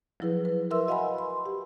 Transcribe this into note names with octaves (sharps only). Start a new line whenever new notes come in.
F3 F#3 E4 G#4 B4
B4
A#4 B4 E5 C6 E6
F#4 D#5 F5 F#5 G#5 B5
C6
G4